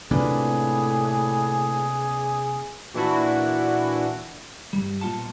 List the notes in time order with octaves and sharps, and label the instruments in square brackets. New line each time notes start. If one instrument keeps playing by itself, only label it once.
[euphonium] A2 [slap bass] C3 A#3 C4 [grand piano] D4 F4 B4 [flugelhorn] G#4
[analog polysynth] A#2 E3 D4 E4 F#4
[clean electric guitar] G2 G3
B1 A#2 F4 F#5 A5